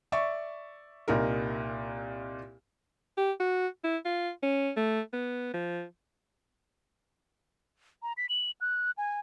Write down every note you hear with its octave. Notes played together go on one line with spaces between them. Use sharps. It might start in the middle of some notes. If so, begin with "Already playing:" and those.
D5 E5 C#6
C2 A#2 D#4 A#4
G4
F#4
E4
F4
C#4
A3
B3
F3
A#5
B6
F#7
F#6
G#5